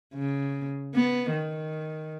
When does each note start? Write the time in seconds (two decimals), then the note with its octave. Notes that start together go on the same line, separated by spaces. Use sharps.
0.15 C#3
0.95 B3
1.31 D#3